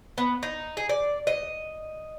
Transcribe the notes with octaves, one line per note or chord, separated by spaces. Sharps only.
B3
D#4
G#4
D5
D#5